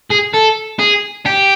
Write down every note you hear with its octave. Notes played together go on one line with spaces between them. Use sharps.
G#4
A4
G#4
G4